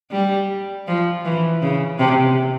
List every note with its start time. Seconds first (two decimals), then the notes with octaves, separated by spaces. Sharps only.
0.12 G3
0.87 F3
1.25 E3
1.62 C#3
1.99 C3